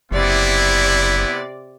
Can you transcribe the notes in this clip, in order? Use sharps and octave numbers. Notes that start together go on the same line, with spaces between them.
F#1 C3 B3 E4 D5